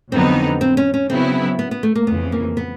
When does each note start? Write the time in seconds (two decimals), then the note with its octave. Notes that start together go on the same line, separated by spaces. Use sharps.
0.12 F2 D3 F#3 B3 C4 D#4
0.61 C4
0.77 C#4
0.94 C#4
1.10 C#3 F#3 B3 C4 E4
1.59 B3
1.71 B3
1.83 A3
1.95 A#3
2.07 F2 C#3 E3 B3
2.32 A#3
2.57 B3